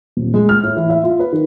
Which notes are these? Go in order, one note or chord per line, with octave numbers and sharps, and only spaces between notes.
D#1
G#3
F6
A2
E3
E5
F4
B4
D#3